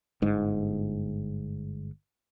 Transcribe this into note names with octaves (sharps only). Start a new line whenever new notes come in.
G1 G#2